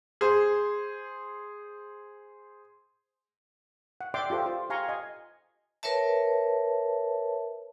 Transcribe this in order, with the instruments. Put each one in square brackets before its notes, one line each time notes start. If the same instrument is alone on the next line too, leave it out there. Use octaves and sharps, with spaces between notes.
[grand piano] G#4 C5
[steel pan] F#5
D5 E5 G5 C6 D6
F4 G4 A4 C5
F4 C5
G4 F5 G#5 A#5 C6 C#6
D#5 G#5
[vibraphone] A#4 B4 C#5 E5 A5